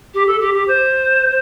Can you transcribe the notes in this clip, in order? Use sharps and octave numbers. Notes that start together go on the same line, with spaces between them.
G4
A4
G4
G4
C5